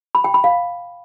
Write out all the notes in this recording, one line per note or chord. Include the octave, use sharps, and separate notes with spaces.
B5
G5
B5
F5